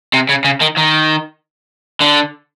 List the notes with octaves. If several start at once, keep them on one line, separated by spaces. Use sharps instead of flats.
C3
C#3
C#3
D#3
D#3
D3